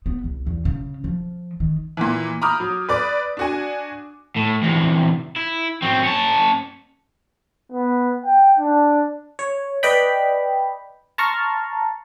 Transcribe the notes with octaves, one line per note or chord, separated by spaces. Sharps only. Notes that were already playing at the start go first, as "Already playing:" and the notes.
B3
C2
E2
C#3
F3
D#3
A#2 E3
A#5 B5 D6 D#6 F6 G6
F#3
B4 D5 D6
D4 F#4 G#5
A2
E2 C3
E4
F#3 C4
C#4 A5
B3
G5
D4
C#5
B4 D5 D#5 G5 B5
A5 A#5 C6 C#6 F6